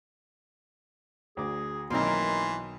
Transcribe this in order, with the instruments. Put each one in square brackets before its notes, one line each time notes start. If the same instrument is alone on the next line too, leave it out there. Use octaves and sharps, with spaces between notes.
[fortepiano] D2 D6 [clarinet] G#4
[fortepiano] B1 D#3 [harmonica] E3 [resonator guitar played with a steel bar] A#3 C4 A#4 [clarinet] C6